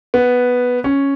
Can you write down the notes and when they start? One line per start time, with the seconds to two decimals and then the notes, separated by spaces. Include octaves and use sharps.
0.14 B3
0.84 C#4